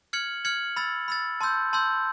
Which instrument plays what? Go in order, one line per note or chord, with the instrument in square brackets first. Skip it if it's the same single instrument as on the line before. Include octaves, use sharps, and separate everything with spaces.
[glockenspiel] F6 G#6 C#7 F#7
F6 G#6 C#7 F#7
B5 E6 A6
B5 E6 A6
A5 C6 E6 G6
A5 C6 E6 G6